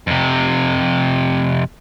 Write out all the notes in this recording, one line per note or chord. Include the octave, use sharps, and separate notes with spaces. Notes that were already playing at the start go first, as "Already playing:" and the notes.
F2 C3